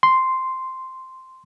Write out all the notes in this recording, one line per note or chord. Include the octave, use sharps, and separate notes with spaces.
C6